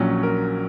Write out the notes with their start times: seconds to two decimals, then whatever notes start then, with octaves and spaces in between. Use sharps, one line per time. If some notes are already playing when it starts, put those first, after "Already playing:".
Already playing: A#1 A#2 F#3 C#4
0.23 A#4